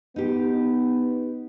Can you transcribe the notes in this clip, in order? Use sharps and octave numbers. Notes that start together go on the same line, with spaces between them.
B3 D#4 G4